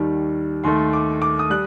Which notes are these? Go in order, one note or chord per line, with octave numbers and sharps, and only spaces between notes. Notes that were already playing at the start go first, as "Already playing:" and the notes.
Already playing: D#2 D#3 G3
D#2 D#3 A3 C6
D6
D6
D#6
G3 F#6